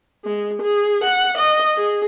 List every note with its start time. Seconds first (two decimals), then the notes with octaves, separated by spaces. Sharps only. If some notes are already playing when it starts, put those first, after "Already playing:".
0.25 G#3
0.63 G#4
1.04 F#5
1.38 D#5
1.77 G#4